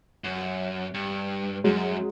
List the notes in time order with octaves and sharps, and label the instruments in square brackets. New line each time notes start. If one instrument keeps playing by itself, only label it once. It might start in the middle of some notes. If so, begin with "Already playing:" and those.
[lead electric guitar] F#2
G2
[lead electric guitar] F#2 [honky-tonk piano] F#3 G#3